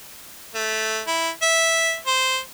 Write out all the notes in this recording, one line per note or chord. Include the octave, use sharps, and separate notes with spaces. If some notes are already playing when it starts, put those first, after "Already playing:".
A3
E4
E5
C5